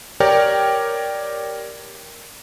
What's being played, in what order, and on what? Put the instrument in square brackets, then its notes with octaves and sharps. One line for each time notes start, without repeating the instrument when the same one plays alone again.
[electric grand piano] G4 A#4 C#5 D5 G5